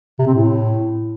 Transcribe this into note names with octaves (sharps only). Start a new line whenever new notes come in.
C3
C4
A2